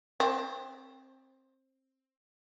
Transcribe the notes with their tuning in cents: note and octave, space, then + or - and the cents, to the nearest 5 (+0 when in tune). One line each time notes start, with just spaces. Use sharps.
C4 +20